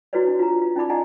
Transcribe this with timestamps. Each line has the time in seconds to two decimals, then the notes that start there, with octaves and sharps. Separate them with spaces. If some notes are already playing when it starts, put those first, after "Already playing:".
0.13 E4 F#4 G#4 B4 C#5 D5
0.27 D4
0.39 F4 A#5
0.62 F4
0.76 C#4 D#4 E4 D5 B5 D6
0.89 G#4 D5 D#5 F#5 G#5 A#5